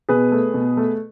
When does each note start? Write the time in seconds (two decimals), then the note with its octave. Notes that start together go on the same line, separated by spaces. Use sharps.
0.09 B2 G#4 B4
0.32 A3
0.54 B2
0.77 A3